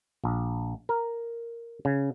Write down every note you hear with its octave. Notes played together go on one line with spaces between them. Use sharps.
A#1
A#4
C#3